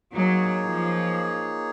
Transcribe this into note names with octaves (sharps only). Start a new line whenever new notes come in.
F#3 A#3 D#4 G#4 C#5
F3